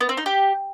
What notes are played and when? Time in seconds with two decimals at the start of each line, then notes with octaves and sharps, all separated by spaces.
0.01 B3
0.09 C4
0.17 D#4
0.26 G4